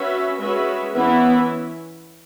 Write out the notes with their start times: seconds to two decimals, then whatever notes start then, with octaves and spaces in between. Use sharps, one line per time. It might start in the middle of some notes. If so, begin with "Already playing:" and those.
Already playing: C#4 F#4 B4 E5
0.41 G#3 C#4 F#4 B4 E5
0.96 E3 B3 C#4 E4 B4 E5